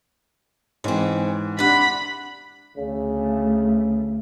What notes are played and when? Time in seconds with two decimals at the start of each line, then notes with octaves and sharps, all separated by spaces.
0.84 G#2 E3 C4 C#4
1.59 C3 D4 F#5 B5
2.77 D2 C#3 A3